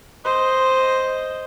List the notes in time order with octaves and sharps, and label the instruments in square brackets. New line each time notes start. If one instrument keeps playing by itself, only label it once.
[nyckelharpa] C5 D#5